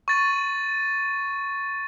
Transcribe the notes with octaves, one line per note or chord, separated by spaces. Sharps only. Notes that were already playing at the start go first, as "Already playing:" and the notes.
C#6 A6 D#7